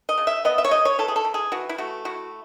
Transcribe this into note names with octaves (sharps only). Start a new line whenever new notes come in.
D#5
C#3
E5
B3 D#5
E5
C#5
C#3 D#5
C#5
E3 A4
G#4
A4
E3
G#4
E3 F#4
E4
A3 F#4
E4 F#4